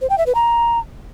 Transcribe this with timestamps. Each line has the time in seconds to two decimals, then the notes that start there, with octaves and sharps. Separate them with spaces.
0.01 C5
0.10 G5
0.18 E5
0.26 B4
0.35 A#5